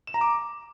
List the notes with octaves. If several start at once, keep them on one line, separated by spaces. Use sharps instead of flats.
E7
A#5
D6